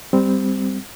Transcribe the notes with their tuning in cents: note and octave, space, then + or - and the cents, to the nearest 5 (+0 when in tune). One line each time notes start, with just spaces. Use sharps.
G3 +10 C4 -10